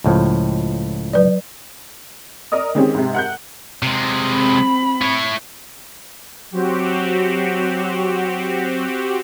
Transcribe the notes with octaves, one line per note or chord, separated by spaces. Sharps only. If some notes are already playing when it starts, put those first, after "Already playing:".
C#2 A2 F3
F#3 B4 D5
A#4 D5 D#5 D#6
D#3 G#3 C4 C#4 G4
G#2 C3
F#5 F#6 G6
C3 G#3
C4 B5
E4 C#5
F#3 C4 F#4 G4